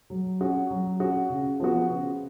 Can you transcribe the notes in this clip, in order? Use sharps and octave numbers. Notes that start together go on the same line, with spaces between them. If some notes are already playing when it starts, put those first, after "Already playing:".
F#3
C#4 F#4
F#3
C#4 F#4
C#3
F3 B3 F#4
C#3